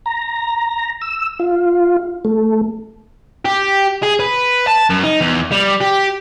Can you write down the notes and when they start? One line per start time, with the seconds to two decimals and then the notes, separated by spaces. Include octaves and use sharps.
0.06 A#5
1.02 E6
1.40 F4
2.25 A3
3.45 G4
4.03 G#4
4.20 B4
4.67 A5
4.90 F#2
5.04 D#4
5.21 E2
5.52 G3
5.81 G4